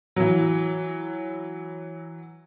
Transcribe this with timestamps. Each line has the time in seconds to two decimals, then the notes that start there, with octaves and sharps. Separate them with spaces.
0.16 E3 F#3